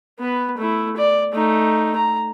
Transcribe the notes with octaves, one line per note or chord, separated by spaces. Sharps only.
B3 B4
A3 E4
D5
A3 D#4
A#5